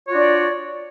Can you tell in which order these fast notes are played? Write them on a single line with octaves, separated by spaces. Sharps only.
C#5 F4 F#4 D4 D5